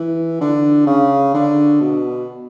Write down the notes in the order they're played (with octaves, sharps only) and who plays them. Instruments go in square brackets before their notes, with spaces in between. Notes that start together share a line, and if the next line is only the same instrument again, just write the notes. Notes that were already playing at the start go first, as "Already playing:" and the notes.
Already playing: [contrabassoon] E3
D3
C#3
D3
B2